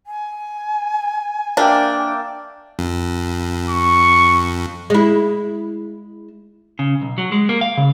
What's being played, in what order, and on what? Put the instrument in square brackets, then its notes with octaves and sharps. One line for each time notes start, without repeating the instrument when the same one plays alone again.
[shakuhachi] G#5
[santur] A#3 E5 G5 [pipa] D4
[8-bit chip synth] F2
[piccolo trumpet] C#6
[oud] G#3 E4
[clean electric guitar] C#3
B1
F#3
G#3
A#3
F5
C#3